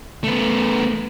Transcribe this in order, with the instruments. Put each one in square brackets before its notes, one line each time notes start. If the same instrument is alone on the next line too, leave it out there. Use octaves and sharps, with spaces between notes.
[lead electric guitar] A3 B3